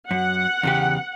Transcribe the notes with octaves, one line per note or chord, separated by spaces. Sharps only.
F#2 F#5
E2 C#3 G4